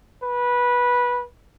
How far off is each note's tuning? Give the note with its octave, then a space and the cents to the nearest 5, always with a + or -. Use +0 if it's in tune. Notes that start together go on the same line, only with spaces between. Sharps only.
B4 -15